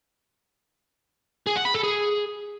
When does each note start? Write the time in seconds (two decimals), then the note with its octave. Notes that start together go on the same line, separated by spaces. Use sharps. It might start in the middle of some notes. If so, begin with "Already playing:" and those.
1.47 G#4
1.56 F#5
1.65 B5
1.74 A4
1.83 G#4